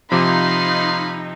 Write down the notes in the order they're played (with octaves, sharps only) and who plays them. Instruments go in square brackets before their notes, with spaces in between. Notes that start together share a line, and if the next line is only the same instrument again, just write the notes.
[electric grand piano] C3 F3 D6 [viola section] D#4 [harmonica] F5 B5 C6